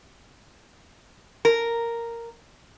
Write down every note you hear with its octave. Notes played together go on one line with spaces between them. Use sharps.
A#4